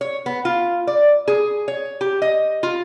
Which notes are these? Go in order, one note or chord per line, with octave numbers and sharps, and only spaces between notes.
C#5
B3
F4
D5
G#4
C#5
G4
D#5
F4